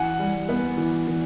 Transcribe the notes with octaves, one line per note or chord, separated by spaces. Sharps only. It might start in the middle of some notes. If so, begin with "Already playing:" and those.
Already playing: E3 F#5 G#5
G3
B3
E3
E3